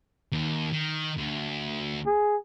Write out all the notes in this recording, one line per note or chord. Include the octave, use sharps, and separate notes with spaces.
D#2
D#3
D2
G#4